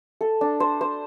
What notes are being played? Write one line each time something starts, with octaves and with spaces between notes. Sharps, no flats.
A4
D4
C5
C5